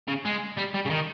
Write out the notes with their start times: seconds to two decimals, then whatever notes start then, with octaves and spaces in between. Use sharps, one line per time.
0.08 C#3
0.25 G#3
0.57 G3
0.74 G3
0.85 C#3
0.90 D#3